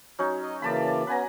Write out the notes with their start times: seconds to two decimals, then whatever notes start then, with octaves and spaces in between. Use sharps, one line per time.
0.19 F#3 C#4 D#4
0.42 D#5
0.62 C#3 E3 A#3 D5 A5 B5
1.07 B3 C#4 B4 G#5 A#5